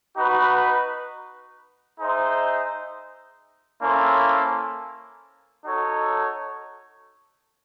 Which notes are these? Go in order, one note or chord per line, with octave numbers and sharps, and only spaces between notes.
D#4 F#4 B4
D#4 G#4 C5 E5
A#3 C#4 E4 A4 C5
D#4 F#4 A4 C#5